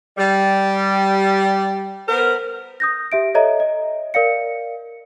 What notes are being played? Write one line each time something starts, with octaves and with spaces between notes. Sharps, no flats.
G3
B3 A#4 C5
D#6 G6 A#6
G4 E5 D7
A4 C#5 D#5 E5 A#5
D#5
A#4 D5 F5 C#7